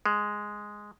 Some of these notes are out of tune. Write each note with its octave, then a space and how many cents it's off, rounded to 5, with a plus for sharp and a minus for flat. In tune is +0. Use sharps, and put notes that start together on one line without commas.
G#3 +0